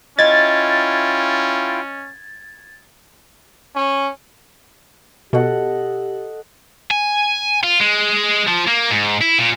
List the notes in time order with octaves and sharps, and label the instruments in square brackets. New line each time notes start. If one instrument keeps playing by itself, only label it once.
[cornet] C#4 [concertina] E4 F4 G5 [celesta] D#5 [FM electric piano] G#6 A6
[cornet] C#4
[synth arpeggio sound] B2 [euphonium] G4 [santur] A4 D#5 F#5
[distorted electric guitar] G#5
F4
G#3
F3
A#3
G#2
E4
A#2